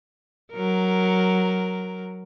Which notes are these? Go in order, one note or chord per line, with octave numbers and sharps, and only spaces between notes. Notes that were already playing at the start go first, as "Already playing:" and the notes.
F#3 A#4